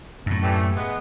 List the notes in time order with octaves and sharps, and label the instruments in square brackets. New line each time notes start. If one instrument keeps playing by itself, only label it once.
[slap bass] F#2 A2
[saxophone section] E3 G3 A3
G#3 B3